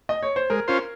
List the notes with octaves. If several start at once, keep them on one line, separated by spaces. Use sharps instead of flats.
D#5
C#5
C5
G#3 A#4
C#4 F4 C5